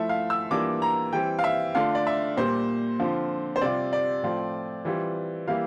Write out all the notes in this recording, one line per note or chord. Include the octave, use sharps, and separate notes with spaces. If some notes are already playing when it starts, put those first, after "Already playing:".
Already playing: F3 A3 E4 E5
F5
E6
E3 G3 A#3 D4 F4 D6
A#5
E3 G3 C4 G5
F5
E5
D3 A3 D4 F4 F5
D5
E5
A#2 G3 A#3 C5
D3 F3 C4 F4
C5
C3 G3 C4 F4 D5
D5
A2 F3 C4 F4
E3 G3 C4 F4
E3 G3 A#3 E4 F5